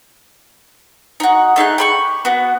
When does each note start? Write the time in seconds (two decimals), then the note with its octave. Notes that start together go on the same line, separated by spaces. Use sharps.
1.20 D#4 F#4
1.56 A3 D#4 G#4 F#6
1.78 G4 B5 C#6
2.25 B3 F#4